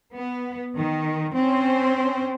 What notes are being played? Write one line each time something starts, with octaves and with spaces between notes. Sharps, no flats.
B3
D#3
C4 C#4 C5